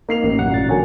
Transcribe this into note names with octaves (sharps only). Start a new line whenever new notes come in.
A#3 D#4 C7 F7
A1
B1 F#2 F#5
A#2 A6
D3 F#3 F#4 A#4 G#5